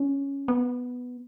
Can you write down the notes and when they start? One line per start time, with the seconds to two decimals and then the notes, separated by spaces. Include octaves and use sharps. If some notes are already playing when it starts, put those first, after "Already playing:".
Already playing: C#4
0.48 B3